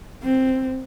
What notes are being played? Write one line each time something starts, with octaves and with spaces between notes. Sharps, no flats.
C4